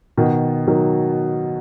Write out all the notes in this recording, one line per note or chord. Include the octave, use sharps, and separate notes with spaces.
B2 D#3
D#3 F#3